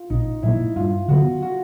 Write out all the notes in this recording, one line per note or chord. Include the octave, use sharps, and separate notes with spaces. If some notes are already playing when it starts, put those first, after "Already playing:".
Already playing: F4
A#1 D#4
A#2 F#3 A#3 E4
G2 F4
D3 F#3 B3 F#4
F#4